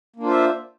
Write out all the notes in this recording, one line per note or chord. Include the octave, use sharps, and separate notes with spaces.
A#3 D4 F4 C5 E5